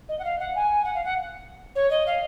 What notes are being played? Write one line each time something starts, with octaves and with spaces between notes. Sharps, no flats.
D#5
F#5
F5
F#5
G#5
F#5
F5
F#5
C#5
D#5
F5